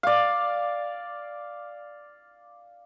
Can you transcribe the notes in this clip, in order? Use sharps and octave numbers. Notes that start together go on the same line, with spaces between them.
D5 F5